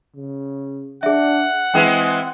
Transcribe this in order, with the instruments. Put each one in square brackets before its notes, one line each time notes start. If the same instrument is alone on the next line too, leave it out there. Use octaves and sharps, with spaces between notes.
[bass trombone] C#3
[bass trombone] D4 [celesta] G#4 E5 [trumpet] F#5
[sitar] E3 G#3 E4 [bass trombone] C4 [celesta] G5